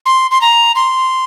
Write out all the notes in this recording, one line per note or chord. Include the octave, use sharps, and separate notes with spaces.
C6
C6
A#5
C6